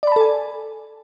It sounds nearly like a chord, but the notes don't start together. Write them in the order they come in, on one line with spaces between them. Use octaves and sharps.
D5 B5 A5 A4 G#5